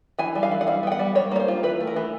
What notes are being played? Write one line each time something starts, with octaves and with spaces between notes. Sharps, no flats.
E3 G#5
G3
F5
E3
F#5
G3 F5
B3 G5
F#5
G3
G3 C#5
A#3 C#5
C5
F4
E3 B4
A3
A#4
E3